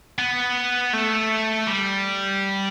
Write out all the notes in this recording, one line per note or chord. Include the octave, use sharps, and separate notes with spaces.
B3
A3
G3